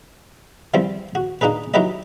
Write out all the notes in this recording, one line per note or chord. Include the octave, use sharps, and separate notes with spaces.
E3 F3 G3 C4
F#4
A#3 D4 D#4 G#4 B4
F#3 D#4 E4 G4 B4 D#5